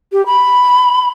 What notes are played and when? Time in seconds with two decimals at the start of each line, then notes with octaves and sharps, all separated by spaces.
0.13 G4
0.26 B5